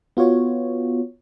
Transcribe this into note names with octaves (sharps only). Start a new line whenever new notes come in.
B3 F4 F#4 C#5